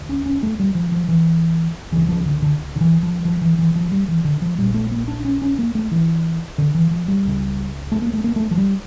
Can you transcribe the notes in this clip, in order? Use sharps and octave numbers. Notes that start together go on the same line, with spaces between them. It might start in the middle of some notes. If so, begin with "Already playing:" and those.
Already playing: E1 D2
C#4
C#4
A3
G3
F3
F3
E3
C#2 C#3 E3
F3
D3
D3
D3
E3
F3
F3
E3
E3
F3
G3
E3
D3
F3
A#1 A#2 G3
A3
A#3
D4
C#4
C#4
A#3
A3
E3
D3
E3
F3
G3
C#2 C#3
A3
A#3
A3
A#3
A3
F3
G3